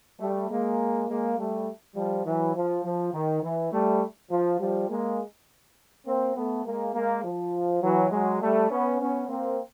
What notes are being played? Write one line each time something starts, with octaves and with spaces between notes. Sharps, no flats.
G3 A3
G#3 A#3
G#3 A#3
G3 A3
F3 G3
E3 F#3
F3
F3
D#3
E3
G3 A3
F3
F3 G3
G#3 A#3
A#3 C4
A3 B3
G#3 A#3
G#3 A#3
F3
E3 F#3
F#3 G#3
G3 A3
B3 C#4
B3 C#4
A#3 C4